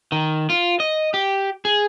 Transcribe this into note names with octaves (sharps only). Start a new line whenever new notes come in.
D#3
F4
D#5
G4
G#4